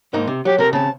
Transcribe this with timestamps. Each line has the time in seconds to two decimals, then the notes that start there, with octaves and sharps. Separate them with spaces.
0.13 G#2 A#3 D#4
0.27 C3
0.45 F#3 G4
0.58 C3 A4 A#4
0.73 C#3 C4 A5